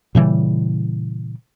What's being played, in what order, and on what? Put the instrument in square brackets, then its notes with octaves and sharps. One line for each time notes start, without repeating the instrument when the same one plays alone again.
[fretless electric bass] A#2 C#3 E3 G3